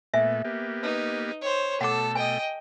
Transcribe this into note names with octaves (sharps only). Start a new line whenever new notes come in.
A#2 A3 B3 E5 G#5
A#3 B3 G4
D#4 B4
C5 C#5
B2 A3 A4 F#5 A5 D6
D#5 G5 G#5